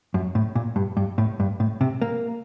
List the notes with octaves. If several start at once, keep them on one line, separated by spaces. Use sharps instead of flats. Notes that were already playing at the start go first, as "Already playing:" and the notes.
F#2
A2
A#2
G2
G2
A2
G2
A2
C3
A#3